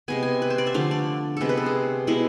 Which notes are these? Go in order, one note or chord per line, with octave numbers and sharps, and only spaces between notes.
C3 G#3 B3 G#5
G#5
B4
C5
D5
E5
D3 F3 A3 F5
D5
C3 G#3 B3 A4 B4
B4
A4
G#4
B2 G#3 B3 E4